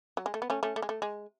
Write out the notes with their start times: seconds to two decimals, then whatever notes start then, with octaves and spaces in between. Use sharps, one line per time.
0.17 F#3
0.26 G#3
0.34 A3
0.42 B3
0.50 A3 C#4
0.63 A3 C#4
0.76 A3
0.82 G#3
0.89 A3
1.02 G#3